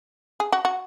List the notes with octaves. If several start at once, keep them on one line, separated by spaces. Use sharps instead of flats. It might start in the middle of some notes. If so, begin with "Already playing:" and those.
G#4
F#4
F#4